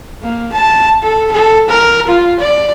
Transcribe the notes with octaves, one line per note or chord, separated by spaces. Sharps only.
A#3
A5
A4
A4
A#4
F4
D5